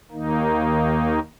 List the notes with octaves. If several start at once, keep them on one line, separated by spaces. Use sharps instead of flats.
D#2 D#3 A#3 D#4